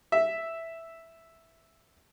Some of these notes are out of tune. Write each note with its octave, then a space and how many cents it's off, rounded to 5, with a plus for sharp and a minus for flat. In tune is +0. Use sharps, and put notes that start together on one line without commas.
E5 +0